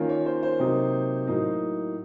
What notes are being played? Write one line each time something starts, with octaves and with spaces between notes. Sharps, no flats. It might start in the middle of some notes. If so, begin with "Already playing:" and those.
Already playing: D#3 A#3 C#4 F4
C#5
C5
C5
C3 F#3 A#3 D#4
A2 F#3 A#3 D#4